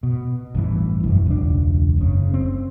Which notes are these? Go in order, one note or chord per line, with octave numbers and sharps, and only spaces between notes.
B2
A1 G2 C#3 E3
E1 F#2 E3
E1 C#2 D4
F#1 C#3
C4